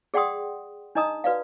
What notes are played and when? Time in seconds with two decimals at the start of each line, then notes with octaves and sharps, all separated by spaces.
0.14 G#4 D5 F#5 G5 C6 D#6
0.95 D4 D#4 D#5 A#5 D#6
1.24 F#4 B4 D5 F5